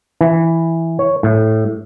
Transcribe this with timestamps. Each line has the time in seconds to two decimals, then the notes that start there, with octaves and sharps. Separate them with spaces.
0.21 E3
0.99 C#5
1.23 A2